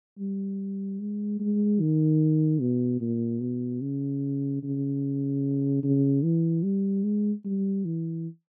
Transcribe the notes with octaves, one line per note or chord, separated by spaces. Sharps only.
G3
G#3
G#3
D#3
B2
A#2
B2
C#3
C#3
C#3
E3
G3
G#3
G3
E3